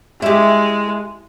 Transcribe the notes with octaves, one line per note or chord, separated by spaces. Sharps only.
G#3 E4 G4